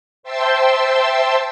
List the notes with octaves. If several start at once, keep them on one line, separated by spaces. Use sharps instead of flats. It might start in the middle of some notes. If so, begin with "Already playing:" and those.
C5 E5 G5 A5 C6 E6